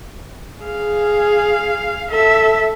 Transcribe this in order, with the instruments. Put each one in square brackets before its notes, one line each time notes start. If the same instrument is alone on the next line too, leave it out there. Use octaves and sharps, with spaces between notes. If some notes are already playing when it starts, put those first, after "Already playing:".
[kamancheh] G#4 [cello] F5
[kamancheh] A4 [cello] E5